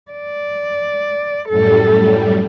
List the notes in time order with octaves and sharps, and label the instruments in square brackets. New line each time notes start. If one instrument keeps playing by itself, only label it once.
[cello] D5
[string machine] F#2 A2 G3 [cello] A4